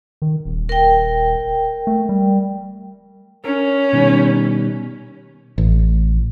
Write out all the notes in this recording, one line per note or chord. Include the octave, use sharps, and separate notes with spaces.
D#3
D#1
A#4 G5
A3
G3
C#4 A#4
B2 D#3 G3
A1